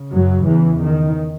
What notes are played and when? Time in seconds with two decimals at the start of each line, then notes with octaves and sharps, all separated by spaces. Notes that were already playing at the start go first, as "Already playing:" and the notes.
Already playing: C#3
0.12 F#2 F#3
0.47 E2 E3
0.80 D#3